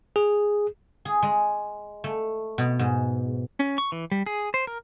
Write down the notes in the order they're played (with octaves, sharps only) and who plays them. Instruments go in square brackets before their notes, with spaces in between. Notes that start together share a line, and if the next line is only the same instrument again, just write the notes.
[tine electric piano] G#4
[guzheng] G#4
G#3
A3
B2
G#2
[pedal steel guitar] C#4
C#6
E3
G3
G#4
C5
A#4